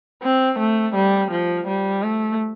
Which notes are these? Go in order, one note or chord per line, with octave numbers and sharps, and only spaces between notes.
C4
A3
G3
F3
G3
A3